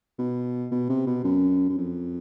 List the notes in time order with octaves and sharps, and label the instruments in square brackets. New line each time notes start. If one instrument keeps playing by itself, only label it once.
[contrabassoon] B2
B2
C3
B2
F#2
F#2
F2